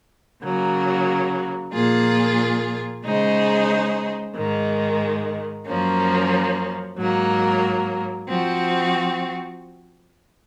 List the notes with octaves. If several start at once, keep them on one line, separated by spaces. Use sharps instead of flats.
C#3 F#3 A#3
A#2 F3 A#3 F4 G#4
C#3 G#3 D#4 G#4 C5
G#2 D#3 G#3
F#2 F3 A#3 C#4
G#2 F#3 A#3
F3 C4 F#4